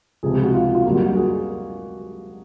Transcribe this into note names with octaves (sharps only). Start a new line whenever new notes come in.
C#2 C3 F3 G#4
G4
F#4
F4
F#4
F4
F#2 D3 G3 A#3 F#4
F#4
F#4
G#4